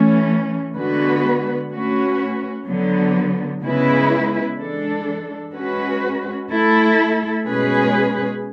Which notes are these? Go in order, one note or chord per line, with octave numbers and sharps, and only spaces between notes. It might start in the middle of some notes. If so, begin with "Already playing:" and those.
Already playing: E3 A3 C#4
D3 G#3 B3 F#4 B4
A3 C#4 F#4 B4
D3 F#3 B3
C#3 G#3 B3 E4 B4
E3 G#3 D4 A4
G#3 C#4 F#4 B4
A3 E4 A4
B2 G#3 C#4 G#4 B4